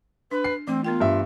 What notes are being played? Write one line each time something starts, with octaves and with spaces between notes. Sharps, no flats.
D4 B4
C7
E3 A3 C4
B3 F4 A#4 G5
G2 E5